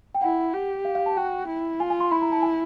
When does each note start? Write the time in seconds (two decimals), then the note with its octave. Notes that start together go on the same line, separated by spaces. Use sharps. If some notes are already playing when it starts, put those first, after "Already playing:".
0.15 G5
0.22 E4 F#5
0.53 G4
0.85 F5
0.95 F5
1.06 A5
1.16 F#4 G5
1.48 E4
1.80 F4 G#5
1.90 G#5
2.00 C6
2.11 E4 B5
2.22 A#5
2.32 A5
2.42 G#5